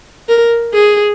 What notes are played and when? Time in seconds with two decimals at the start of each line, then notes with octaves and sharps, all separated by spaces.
0.29 A#4
0.73 G#4